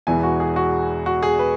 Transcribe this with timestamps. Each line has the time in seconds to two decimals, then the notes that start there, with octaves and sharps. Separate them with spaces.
0.07 E1 E2 E3 G#5
0.23 F#4
0.40 G#4
0.56 F#4
1.06 F#4
1.23 G#4
1.39 B4